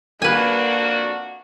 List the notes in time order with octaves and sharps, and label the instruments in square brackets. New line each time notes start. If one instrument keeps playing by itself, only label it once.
[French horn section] F2 D4 F#4 [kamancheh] A#3 [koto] B4 G#5